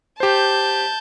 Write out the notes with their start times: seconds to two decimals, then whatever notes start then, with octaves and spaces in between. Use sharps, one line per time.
0.20 G4 C5 A5 G6